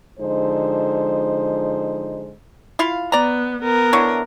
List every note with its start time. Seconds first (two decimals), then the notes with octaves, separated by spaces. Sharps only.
0.19 D3 F3 G#3 D#4 C5
2.79 E4 F4 F5
3.12 B3 D5 A#5
3.62 B3 A#4
3.93 D3 E4 C#5